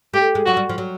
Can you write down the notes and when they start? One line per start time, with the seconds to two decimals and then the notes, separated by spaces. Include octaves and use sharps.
0.13 A3 G4
0.35 G#3
0.46 F#3 F#4
0.57 G3
0.69 F3
0.78 F#3